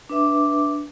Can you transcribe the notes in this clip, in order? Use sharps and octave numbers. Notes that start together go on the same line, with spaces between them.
D4 B4 E5 D6